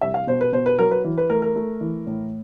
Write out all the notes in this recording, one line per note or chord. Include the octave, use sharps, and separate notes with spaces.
C2 E5
F5
B2 C5
B4
B2 C5
B4
F#3 A#4
B4
E3
B4
A3 A#4
A#4
A3
E3
A2